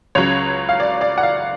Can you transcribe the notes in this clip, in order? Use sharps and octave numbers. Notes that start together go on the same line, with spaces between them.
C#2 C#3 F#3 C#5
F5
D5
D5
F#5
F5